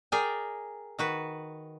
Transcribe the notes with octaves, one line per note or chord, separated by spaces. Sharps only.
G#4 A#4 D5 G5 G#5
D#3 F#4 B4